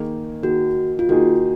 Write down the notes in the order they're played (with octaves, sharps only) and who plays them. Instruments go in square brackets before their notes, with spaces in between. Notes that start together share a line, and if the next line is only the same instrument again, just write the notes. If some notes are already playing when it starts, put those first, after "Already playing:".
Already playing: [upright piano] D#3 A#3 D#4 G#4
[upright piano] D#3 A#3 D#4 G#4 [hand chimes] F#4
[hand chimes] F4
[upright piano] D#3 A#3 D#4 G#4 [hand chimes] F#4